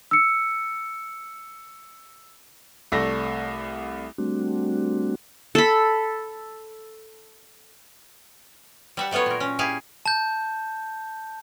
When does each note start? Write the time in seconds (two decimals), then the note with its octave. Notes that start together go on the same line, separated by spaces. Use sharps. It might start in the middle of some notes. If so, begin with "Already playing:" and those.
0.11 E6 C#7
2.92 C2 A3 A4 D5 E5 A#6
4.18 G3 A3 C4 D4 F#4
5.55 A4 B5
8.97 G3 E5 F#5
9.11 F#3 A3 B3 F4 C#5
9.26 A#2 A#4
9.40 C#4
9.59 E4 G4 G#4 F5
10.06 A5 G6